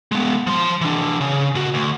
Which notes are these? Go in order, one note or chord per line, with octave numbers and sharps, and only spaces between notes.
G#3 B3
F3 C6
E3 D4
C#3
A#2 F#4
D2